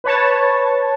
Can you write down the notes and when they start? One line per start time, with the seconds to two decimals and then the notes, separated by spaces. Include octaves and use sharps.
0.04 B4 C#5 A5